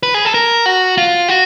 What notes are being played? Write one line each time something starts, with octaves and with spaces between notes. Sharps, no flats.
B4
G#4
A4
A#4
F#4
F4
F#4